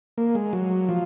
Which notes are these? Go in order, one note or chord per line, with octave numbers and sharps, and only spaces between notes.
A#3
G#3
F#3
F3